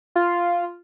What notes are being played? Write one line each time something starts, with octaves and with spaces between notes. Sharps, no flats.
F4